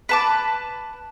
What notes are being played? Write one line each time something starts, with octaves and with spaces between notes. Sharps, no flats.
B4 A5 D6